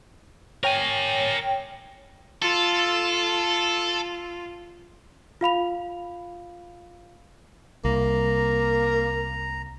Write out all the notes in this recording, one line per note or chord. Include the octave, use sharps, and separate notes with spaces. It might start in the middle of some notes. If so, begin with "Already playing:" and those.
A#4 C#5 G5 G#5 A#6
F4 A4
F4 F5 B5 F7
C2 A#3 A#5